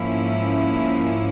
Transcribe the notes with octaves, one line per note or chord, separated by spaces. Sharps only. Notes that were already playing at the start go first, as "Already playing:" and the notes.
Already playing: G#2 F3 A#3 C#4 E4